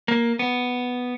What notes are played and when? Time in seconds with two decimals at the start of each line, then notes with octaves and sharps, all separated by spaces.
0.08 A#3
0.39 B3